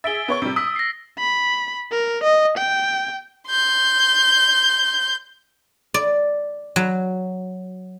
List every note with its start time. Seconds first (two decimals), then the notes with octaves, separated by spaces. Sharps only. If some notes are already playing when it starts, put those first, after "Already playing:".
0.04 G#4 E5 A6 D7 G7
0.28 B3 C#5 C#6
0.42 C3 G3
0.56 D#6 E6 B6
0.76 A#6 C7
1.19 B5
1.92 A#4
2.23 D#5
2.58 G5
3.48 C6 G6
5.94 D5
6.76 F#3